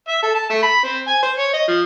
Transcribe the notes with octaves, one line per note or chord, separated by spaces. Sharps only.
E5
A4
A5
A3
B5
C4
G#5
C5
C#5
D#5
F3